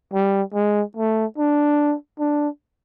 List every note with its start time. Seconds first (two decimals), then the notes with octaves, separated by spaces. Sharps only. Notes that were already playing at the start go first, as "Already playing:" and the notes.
0.13 G3
0.54 G#3
0.97 A3
1.38 D4
2.19 D4